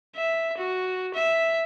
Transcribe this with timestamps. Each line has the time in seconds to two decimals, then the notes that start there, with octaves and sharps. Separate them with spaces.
0.16 E5
0.58 F#4
1.15 E5